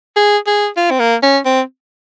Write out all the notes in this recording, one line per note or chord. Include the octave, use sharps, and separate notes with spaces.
G#4
G#4
F4
C4
A#3
C#4
C4